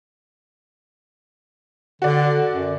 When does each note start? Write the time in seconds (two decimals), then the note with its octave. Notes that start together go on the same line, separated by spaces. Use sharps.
2.02 D3 F#4 D5
2.50 F#2